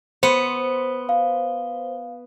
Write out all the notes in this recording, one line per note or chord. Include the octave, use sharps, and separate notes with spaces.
B3 C5 C#7
F5